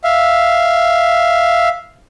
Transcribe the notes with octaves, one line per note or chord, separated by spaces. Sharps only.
E5 F5